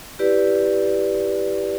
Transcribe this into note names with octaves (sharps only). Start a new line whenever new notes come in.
E4 G4 B4 D5